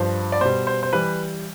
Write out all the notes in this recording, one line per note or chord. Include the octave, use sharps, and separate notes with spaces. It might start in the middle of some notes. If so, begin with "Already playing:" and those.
Already playing: G2 F3 C5
D5
B2 G3 C5
C5
C5
E3 G3 B4